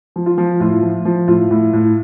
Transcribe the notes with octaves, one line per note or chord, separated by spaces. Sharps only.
F3
F4
F3
A2 F4
F3
F3
A2 F4
A2
A2